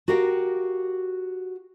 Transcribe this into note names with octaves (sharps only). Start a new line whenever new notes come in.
F#4 G4 A#4 F5 G5